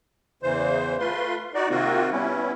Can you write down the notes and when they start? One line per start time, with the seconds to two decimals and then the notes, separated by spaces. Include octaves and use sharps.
0.43 E2 C#3 E3 C5
1.00 A3 F4 B4 C6
1.54 D#4 F#4 D5
1.70 C3 D#3 A#3 C4 F4 F#4
2.12 G3 B3 C#4 E4